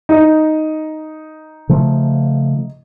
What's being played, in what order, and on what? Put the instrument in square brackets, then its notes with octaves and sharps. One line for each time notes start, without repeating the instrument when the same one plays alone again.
[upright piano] D#4 D#5
[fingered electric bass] C#3 F3 A3